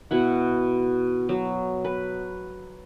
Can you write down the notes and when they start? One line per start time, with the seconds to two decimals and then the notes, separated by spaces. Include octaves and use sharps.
0.11 B2 E4 F#5
1.29 F#3
1.85 B4